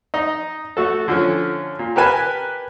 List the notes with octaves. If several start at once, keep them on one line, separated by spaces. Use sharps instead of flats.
D#4 D#5
A3 F#4 A4
D3 F3 C#4
A#2
G4 A#4 B4 G#5 A5 B5